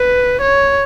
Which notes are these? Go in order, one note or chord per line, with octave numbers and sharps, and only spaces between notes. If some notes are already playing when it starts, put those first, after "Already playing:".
Already playing: B4
C#5